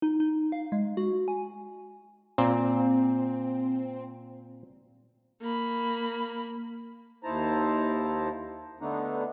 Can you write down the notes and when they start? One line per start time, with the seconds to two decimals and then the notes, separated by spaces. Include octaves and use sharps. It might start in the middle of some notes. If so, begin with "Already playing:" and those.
0.02 D#4
0.20 D#4
0.52 F5
0.72 G#3
0.97 F#4
1.28 G#5
2.38 A#2 C4
5.42 A#3 B5
7.23 D#2 D#4 E4 C5 A5 A#5
8.81 D3 A3 B3 D4 D#4